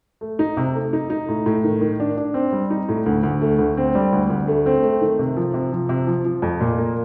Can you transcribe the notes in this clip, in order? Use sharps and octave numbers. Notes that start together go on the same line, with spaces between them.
A3
D#4
C3
A3
D#4
D#4
A2
A2
D#3
D#3
D4
D4
C4
G3
D#4
A2
D2
D2
A3
D2
C4
G3
D2
D2
A3
C4
A3
D#3
C3
F3
C3
F3
C3
F3
F3
F2
A#2
A#3